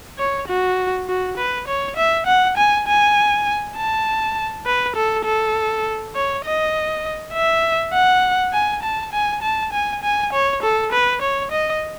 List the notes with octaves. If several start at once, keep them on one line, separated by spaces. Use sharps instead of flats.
C#5
F#4
F#4
B4
C#5
E5
F#5
G#5
G#5
A5
B4
A4
A4
C#5
D#5
E5
F#5
G#5
A5
G#5
A5
G#5
G#5
C#5
A4
B4
C#5
D#5